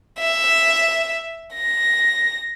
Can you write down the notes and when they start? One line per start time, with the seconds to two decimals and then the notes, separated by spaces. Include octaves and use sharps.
0.20 E5
1.55 A#6